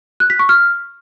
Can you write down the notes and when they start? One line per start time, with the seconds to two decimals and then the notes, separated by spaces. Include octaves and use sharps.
0.20 F#6
0.30 B6
0.39 C#6
0.49 F6